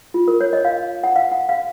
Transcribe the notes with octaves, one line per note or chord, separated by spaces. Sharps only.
F4
A#4
C#5
D#5
F5
F#5
F5
F#5
F5